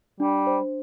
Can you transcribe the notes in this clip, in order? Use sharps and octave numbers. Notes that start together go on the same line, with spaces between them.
G3 D4
C5